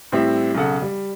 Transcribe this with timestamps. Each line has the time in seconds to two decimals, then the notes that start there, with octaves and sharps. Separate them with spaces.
0.12 A2 G3 C4 G4 E5
0.55 B1 C#3 A4 F#5
0.82 G3